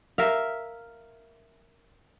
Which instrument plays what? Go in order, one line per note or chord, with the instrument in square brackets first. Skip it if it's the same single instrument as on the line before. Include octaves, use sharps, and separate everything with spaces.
[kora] A#4 E5 F5